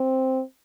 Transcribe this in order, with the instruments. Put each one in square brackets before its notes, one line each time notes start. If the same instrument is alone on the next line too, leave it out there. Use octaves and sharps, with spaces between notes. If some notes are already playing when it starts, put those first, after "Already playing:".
Already playing: [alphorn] C4